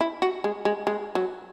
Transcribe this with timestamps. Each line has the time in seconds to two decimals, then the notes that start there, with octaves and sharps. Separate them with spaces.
0.01 E4
0.22 F#4
0.44 G#3
0.65 G#3
0.87 G#3
1.15 F#3